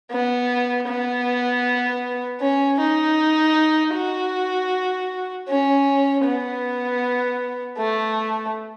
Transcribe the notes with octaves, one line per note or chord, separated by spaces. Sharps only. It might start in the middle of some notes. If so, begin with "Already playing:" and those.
B3
B3
C#4
D#4
F#4
C#4
B3
A3